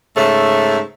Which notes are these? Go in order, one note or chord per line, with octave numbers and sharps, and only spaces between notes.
G#2 C#3 A3 E5